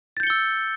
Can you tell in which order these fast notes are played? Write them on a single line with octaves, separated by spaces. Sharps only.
A6 G6 C#7 G7 E6